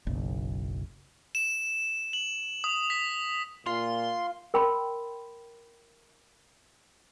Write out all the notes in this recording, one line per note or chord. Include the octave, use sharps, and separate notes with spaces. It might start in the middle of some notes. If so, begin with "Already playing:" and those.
F#1 B1
E7
F#7
D#6
B6
A#2 F4 C6
A#4 G5 B5 C6